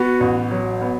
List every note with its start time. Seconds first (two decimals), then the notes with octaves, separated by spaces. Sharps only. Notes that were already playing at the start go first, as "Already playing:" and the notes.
Already playing: B3 F#4
0.20 A1
0.51 F#3
0.81 B3